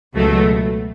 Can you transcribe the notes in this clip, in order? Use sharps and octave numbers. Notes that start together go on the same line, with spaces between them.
C#2 B2 F#3 A3